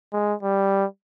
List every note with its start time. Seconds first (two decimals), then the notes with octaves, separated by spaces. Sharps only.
0.13 G#3
0.43 G3